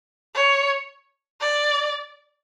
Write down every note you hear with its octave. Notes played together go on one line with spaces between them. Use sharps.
C#5
D5